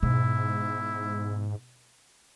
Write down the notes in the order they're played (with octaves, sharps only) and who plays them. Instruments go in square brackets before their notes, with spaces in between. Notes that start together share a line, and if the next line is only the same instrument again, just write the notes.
[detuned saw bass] G#2 [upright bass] B2 [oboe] E4